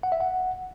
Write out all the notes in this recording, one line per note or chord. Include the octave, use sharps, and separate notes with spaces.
F#5
E5
F#5